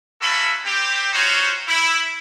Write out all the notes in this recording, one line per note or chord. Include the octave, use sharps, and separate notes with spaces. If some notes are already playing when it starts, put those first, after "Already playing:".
A3 A#3 C#4 F#4 A4 B5
C4 G4
C#4 D#4 F4 F#4 C5 C#5
E4